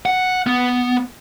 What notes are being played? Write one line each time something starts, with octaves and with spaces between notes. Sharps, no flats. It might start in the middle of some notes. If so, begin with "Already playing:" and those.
F#5
B3